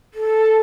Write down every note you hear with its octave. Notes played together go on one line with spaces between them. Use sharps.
A4